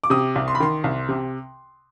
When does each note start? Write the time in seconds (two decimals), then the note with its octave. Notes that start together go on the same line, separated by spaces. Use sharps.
0.04 D6
0.10 C3 D#6
0.36 C2
0.48 C6
0.55 B5
0.60 D#3 C6
0.84 C2
1.09 C3